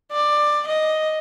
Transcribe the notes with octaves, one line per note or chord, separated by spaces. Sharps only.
D5
D#5